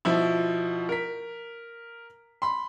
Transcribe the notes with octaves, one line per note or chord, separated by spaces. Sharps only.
B2 F3 E4
A#4 B6
B5 C6